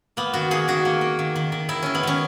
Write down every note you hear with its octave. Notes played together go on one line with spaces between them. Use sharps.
A#3 B3
D#3 F#4
A#3 G#4
D#3 F#4
A#3
A#3
D#3
D#3
D#3
D#3 E4
D#3 C#4
B3
D#3 C#4